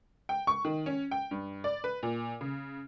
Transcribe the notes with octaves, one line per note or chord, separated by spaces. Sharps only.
G5
C#6
D#3
C#4
G5
G2
D5
B4
A#2
C#3